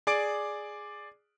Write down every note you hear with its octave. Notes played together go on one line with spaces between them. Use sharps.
G#4 D5 D6 D7